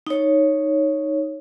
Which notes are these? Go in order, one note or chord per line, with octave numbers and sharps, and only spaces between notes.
D#4 C#5